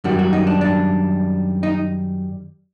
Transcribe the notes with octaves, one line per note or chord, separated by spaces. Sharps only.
F#2 D#3 G3 F#4
F#4
D#4
D4
D4
D#4